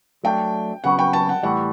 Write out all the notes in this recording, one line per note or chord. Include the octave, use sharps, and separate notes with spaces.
F#3 A3 D4 G5
C#3 F#3 B3 F#4 F#5
G5
A5
F#5
A2 E3 G3 F#5